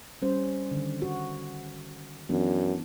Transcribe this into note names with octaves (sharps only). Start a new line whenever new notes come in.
G3 C#4 C5
D3 D#3
F#4
F#2 E3 B3 D4